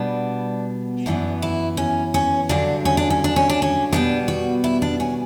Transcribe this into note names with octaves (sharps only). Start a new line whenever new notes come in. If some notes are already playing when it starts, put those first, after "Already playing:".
Already playing: B2 G3 B3 D4
F#2 E3 B3 D4
E4
C#4
C#4
G2 D3 F#3 D4
C#4
D4
C#4
D4
C#4
D4
C#4
B2 G3 B3 D4
F#4
E4
D4
C#4